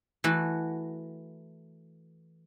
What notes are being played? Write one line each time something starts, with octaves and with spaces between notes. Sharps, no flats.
E3 A3 F#4